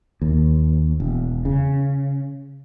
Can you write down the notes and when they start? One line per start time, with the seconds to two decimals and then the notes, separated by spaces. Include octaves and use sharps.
0.21 D#2
1.00 E1
1.45 C#3